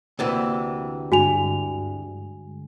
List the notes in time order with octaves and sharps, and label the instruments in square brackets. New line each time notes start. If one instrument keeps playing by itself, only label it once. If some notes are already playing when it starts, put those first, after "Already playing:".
[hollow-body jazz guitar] D2 C3 E3 [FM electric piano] A#3
[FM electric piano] G2 D3 G#3 [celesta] F#4 G#5 F7